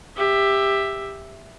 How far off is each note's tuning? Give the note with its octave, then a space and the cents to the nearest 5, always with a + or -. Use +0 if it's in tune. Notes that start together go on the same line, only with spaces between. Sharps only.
G4 +15 E5 +0